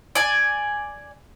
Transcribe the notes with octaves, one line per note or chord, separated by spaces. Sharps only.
D5 G#5